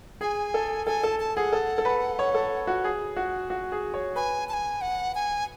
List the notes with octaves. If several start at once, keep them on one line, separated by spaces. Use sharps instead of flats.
G#4 G#5
A4
A4 G#5
A4 A5
A5
G#4 F#5
A4
A4
B4
C#5
A4
F#4
G#4
F#4
F#4
G#4
C#5
B4 G#5
A5
G#5
F#5
G#5